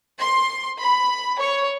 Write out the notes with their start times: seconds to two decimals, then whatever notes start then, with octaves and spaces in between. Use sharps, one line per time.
0.22 C6
0.81 B5
1.41 C#5